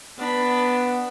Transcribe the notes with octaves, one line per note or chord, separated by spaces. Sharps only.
B3 D4 B5